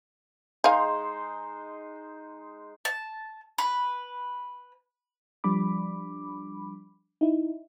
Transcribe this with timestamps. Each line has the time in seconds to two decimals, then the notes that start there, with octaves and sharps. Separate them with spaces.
0.64 G#3 D#4 G#4 C5 F5
2.85 A5
3.58 B4
5.44 F3 G3 D4 B5 D6
7.21 D#4 E4